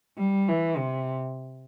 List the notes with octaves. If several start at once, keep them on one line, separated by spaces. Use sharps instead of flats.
G3
E3
C3